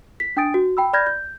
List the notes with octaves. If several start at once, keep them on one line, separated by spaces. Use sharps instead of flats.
B6
D4 G5 G#5 D#6 A6 D7
F#4
G5 B5 E6
D5 B5 F6 G6 G#6 A#6
G6